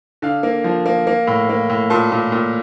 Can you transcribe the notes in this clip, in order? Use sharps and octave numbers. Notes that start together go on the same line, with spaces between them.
D3 F5
A#3
F3
A#3
A#3
A2
A#3
A2
A#2 A5
A#2
A#2